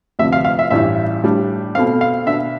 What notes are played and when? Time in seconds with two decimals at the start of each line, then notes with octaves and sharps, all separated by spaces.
0.19 D2 C3 F3 E5
0.33 F5
0.45 F5
0.59 E5
0.71 A1 G2 E3 E5
1.24 A2 G3 D4
1.75 B2 A3 C4 F5
2.01 F5
2.26 B2 B3 D4 E5